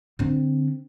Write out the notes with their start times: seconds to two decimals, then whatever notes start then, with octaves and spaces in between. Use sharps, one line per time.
0.19 D3 C4